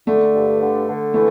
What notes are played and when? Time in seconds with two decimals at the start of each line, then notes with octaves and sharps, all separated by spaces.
0.06 D3 A3
0.33 G2
0.60 D3
0.88 D3
1.14 E3 A3